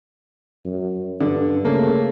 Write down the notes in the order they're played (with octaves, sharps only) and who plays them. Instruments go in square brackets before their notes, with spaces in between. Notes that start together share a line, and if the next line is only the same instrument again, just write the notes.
[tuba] F#2
[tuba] G2 [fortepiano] D3
[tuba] C#3 [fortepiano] A3 A#3